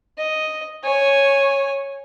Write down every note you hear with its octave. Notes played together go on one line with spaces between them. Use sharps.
D#5
C#5 G#5